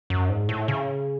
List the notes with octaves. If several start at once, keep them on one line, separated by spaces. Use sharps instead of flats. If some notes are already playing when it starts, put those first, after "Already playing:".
F#2
G#2
A2
C#3